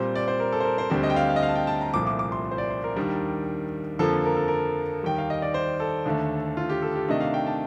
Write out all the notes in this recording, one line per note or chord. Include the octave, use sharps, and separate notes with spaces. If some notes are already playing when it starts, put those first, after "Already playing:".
Already playing: A#2 G3 C4 C5
D5
C5
A#4
A4
C5
A#4
C5
D2 D3 G3 C4
D#5
G5
F5
F5
D#5
F5
A5
G5
A5
A#5
C2 A#2 F3 A3 D6
D6
D6
C6
C5
D5
C5
A#4
D#2 D#3 G3 D4
F2 D3 F3 A#3 A4
A#4
A4
A#4
D#2 D#3 G3 G5
F5
D#5
D5
C5
A4
D#2 D3 A3
F4
G4
A4
G4
C3 D#3 A3 D4 D#5
F5
G5
A5